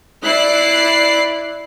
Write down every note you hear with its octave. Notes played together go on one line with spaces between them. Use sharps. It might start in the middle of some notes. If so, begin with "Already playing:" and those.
E4 D5 F#6 C7